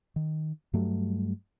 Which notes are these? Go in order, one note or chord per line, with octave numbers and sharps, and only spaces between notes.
D#3
G2 F#3 G3 A3